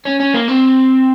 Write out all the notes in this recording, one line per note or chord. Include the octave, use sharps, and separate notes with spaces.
C#4
C#4
A#3
C4